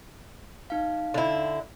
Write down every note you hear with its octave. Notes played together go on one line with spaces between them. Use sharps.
D#4 F5
D3 E4